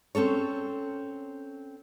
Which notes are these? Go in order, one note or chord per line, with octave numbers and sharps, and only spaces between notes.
C4 C#4 A4 C#5